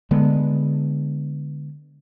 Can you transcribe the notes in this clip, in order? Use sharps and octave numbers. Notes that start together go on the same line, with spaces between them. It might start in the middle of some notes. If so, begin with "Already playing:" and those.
D3 G#3 B3